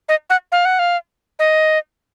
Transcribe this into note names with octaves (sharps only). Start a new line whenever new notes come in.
D#5
F#5
F5
F#5
F5
D#5